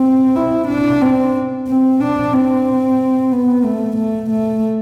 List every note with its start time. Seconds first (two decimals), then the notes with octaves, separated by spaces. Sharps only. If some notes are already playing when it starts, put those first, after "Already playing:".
Already playing: C4
0.36 E4
0.68 D4
1.01 C4
1.68 C4
2.00 D4
2.33 C4
3.32 B3
3.64 A3
3.97 A3
4.30 A3